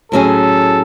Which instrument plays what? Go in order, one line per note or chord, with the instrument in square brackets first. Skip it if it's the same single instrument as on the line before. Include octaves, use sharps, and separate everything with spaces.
[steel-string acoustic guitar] A2 F#3 C#4 G#4 [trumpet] A4